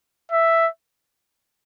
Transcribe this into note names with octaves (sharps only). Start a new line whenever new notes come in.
E5